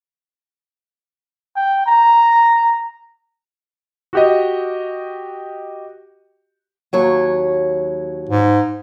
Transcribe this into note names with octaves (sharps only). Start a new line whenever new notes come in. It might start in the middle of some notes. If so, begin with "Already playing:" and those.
G5
A#5
F#4 G4 D#5
D#2 F#3 C#5
G#2